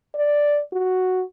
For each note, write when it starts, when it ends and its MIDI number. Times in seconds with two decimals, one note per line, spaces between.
0.15 0.59 74
0.73 1.24 66